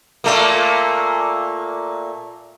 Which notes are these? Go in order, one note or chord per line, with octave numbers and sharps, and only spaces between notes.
A#2 A3 A#3